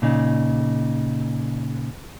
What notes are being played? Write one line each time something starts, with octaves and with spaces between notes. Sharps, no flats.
A#2 C#3 D#4